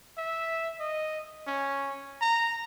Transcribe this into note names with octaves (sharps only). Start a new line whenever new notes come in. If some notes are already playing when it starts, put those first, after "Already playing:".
E5
D#5
C#4
A#5